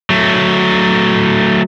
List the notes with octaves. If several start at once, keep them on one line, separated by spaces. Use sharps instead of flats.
F#3 A3